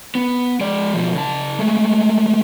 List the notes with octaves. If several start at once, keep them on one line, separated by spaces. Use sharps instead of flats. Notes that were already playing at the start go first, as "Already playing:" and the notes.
B3
G#3 D5
B2 F3
C#3 A5
G#3 A3